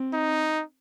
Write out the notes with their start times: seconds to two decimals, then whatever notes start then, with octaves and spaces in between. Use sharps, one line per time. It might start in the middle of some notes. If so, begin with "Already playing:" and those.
Already playing: C4
0.13 D#4